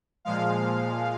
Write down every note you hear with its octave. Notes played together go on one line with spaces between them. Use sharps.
A#2 F3 G#3 F5